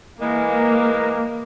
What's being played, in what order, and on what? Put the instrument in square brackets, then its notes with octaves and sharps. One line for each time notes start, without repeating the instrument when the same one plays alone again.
[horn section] E3 G#3 A#4 [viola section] A#3